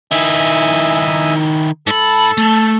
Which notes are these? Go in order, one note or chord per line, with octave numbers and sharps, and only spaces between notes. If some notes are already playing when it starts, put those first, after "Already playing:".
D#3 E4 D#5 E5 G#5
G#2 A4 A5 B5
A3